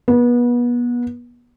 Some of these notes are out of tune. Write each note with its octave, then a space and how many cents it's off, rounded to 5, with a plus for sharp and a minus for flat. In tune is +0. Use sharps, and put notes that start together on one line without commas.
B3 -30